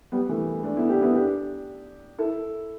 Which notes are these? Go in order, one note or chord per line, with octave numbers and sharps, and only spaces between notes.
G3 B3
E3 A3
A3 D4
B3 E4
D4 G4
B3 E4
D4 G4
E4 A4